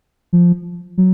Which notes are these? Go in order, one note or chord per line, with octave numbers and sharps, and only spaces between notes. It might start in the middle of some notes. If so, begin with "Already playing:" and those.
F3
F#3